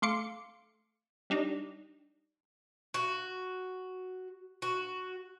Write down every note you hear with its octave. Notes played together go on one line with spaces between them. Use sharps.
A3 F5 C6 D6 C#7
G3 D4 D#4
F#4
F#4